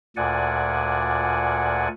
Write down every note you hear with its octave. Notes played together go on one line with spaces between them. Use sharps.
D2 A#2 D5 F#5 G#5